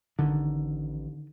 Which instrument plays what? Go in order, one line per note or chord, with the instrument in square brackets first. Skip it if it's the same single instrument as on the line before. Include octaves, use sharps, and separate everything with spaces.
[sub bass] A1 [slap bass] D3 D#3